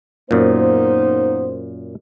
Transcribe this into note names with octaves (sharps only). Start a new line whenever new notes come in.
F#2 A#2 A#3 B3 D#4 C5